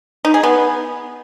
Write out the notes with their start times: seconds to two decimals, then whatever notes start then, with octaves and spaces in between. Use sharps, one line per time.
0.25 D#4
0.34 G#4
0.43 B3